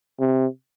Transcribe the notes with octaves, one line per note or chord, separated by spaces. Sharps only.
C3